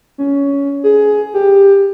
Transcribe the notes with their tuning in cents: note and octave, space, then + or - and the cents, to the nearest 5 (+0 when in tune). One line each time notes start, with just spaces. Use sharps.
C#4 +15
G#4 +15
G4 +15